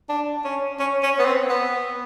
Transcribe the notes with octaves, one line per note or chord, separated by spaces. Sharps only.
D4
C#4
C#4
C#4
B3
C4
B3